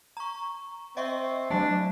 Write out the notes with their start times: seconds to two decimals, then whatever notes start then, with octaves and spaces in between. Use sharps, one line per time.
0.17 A#5 C#6
0.97 C4 D#5 E5 C#6
1.50 F#3 A3 D4